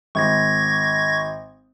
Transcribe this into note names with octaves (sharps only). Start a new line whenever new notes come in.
G#1 C#6 G#6 A#6